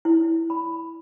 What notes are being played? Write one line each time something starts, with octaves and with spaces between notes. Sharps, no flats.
E4
B5